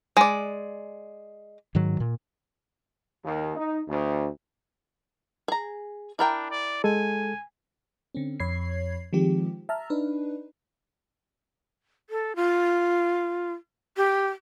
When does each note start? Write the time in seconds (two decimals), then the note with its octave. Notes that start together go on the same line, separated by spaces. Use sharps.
0.17 G#3 D5
1.75 G#2 D#3 F#3
2.00 A#2
3.24 D#2
3.55 D#4
3.88 D2
5.48 G#4 A#5
6.19 D4 E4 A#4 G5
6.51 D5
6.84 G#3 A4 G#5
8.15 D3 C4 C#4
8.40 F2 C#5 B5 G#6 C7
9.13 D#3 F3 G#3 C4 G4
9.69 E5 A5 A#5 F6
9.90 D4 D#4 B4
12.10 A4
12.36 F4
13.97 G4